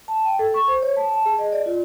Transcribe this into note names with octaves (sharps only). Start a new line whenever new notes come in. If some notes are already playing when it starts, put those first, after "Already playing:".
A5
G5
A4
C#6
C5
C#5
A5
A5
G#4
D#5
D5
F4